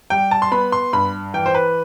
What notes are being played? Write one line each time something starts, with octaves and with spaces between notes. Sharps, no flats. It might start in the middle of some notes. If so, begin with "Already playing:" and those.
G3 G5
A5
C6
B3 B5
C6
G2 B5
E3 G5
C5
B4